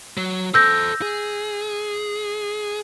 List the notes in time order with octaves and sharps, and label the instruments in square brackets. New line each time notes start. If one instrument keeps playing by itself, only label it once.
[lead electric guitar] F#3
[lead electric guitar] A4 C5 [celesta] E6 G6 A#6
[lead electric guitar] G#4